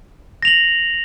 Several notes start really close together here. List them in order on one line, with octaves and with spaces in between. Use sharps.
A#6 F7 F#7